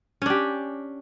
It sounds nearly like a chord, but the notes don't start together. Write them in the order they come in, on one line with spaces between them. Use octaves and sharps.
C#4 D4 G4